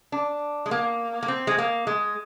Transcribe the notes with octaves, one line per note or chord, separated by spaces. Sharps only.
D4
G#3
A#3
A#3
C4
G#3
A#3
G#3